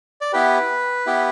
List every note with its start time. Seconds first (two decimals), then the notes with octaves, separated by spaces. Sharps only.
0.21 D5
0.33 B3 E4 G4 B4
1.06 B3 E4 G4